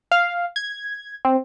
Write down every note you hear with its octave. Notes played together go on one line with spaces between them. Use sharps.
F5
G#6
C4